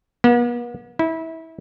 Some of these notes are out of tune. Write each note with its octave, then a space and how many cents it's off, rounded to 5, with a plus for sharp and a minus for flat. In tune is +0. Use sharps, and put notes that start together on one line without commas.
B3 -45
E4 -25